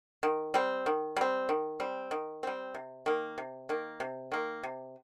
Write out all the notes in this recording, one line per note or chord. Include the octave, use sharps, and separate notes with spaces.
D#3
G3 C4
D#3
G3 C4
D#3
G3 C4
D#3
G3 C4
C3
D#3 A#3
C3
D#3 A#3
C3
D#3 A#3
C3